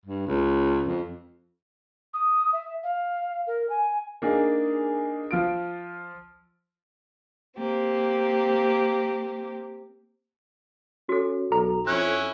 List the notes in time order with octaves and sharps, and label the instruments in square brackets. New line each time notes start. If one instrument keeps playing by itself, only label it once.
[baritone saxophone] G2
C#2
F2
[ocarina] D#6
E5
F5
A#4
G#5
[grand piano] A#3 D4 D#4 G#4
F3 F4 D7
[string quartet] A#3 C4 G4
[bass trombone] C#4 [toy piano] F#4 A4
[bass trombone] B1 [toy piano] A4 [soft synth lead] A#5
[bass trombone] F2 [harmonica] C#4 E4 [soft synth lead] F#6